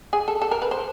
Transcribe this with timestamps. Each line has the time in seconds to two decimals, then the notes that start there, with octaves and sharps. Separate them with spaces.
0.13 G#4
0.28 A4
0.42 A4
0.51 A#4
0.62 B4
0.71 C5